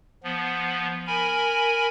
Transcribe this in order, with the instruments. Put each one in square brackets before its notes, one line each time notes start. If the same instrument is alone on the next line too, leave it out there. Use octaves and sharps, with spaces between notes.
[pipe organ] F3 B3
A#4 G#5 B5